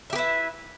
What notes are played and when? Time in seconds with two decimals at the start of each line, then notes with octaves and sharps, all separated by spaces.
0.10 E5
0.13 G4
0.15 B4
0.18 E4